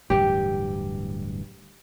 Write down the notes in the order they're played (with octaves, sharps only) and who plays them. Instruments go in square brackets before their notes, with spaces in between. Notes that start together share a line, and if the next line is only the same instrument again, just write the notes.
[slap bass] D1 G2 E3 [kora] G4